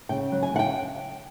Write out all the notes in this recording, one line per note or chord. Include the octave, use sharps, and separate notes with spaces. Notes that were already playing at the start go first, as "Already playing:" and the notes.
C#3 G5
F#3
G#5
C#3 F#5
G5